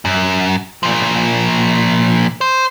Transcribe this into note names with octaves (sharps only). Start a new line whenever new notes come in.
F#2
A#2 F3
C5